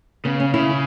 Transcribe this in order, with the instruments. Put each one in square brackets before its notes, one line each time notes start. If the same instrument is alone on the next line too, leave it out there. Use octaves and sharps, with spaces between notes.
[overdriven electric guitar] C#3 [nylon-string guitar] B3
[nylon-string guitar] C#4
[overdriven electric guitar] C#3 [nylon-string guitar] E4